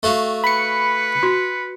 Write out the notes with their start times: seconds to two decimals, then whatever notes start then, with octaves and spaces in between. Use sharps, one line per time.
0.03 A3 F#4 F5
0.44 B4 B5 C#7
1.23 F#4